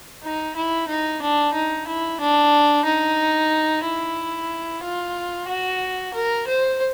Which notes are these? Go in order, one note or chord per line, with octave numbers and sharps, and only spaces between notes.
D#4
E4
D#4
D4
D#4
E4
D4
D#4
E4
F4
F#4
A#4
C5